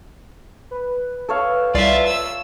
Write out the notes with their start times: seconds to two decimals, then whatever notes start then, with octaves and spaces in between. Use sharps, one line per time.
0.71 B4
1.29 A4 C#5 F5
1.75 C2 F4 D5 E5
2.07 E6